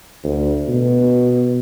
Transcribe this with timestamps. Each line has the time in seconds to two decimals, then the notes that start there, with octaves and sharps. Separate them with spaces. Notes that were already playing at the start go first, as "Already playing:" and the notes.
0.24 D2
0.68 B2